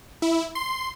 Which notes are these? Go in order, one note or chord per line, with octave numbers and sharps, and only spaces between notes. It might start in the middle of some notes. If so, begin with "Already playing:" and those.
E4
C6